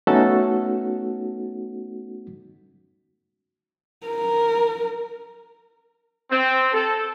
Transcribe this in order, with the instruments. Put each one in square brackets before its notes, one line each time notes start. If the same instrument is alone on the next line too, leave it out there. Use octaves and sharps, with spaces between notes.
[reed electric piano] A3 B3 C#4 D#4 F#4 A4
[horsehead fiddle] A#4
[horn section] C4
A4